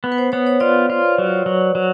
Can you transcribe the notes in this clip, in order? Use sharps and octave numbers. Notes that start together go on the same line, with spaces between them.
B3
B4
C5
B3 C#5
C#5
F4 D5
F4
F#3
F#3
F#3